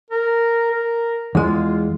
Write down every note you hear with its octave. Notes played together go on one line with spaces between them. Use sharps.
A#4
A#4
E2 G#3 F4